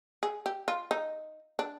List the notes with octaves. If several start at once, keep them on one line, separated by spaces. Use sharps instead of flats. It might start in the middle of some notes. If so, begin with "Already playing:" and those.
G#4
G4
F4
D#4
D4